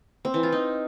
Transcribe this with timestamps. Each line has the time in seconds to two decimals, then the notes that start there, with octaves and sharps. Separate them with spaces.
0.25 C4
0.34 E3
0.43 F4
0.52 D#4